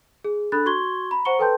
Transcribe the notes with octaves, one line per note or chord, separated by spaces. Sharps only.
G#4
D4 A4 B5 F#6 A6
F#4 C6 C#6 G#6 G7
A#5 B5
C5 F#5 A#5 C#6 C#7 G7
A4 B4 G5 A5 C6 G6